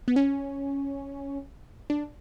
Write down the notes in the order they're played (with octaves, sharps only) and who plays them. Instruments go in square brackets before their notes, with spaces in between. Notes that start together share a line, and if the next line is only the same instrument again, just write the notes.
[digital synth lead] B3
C#4
D4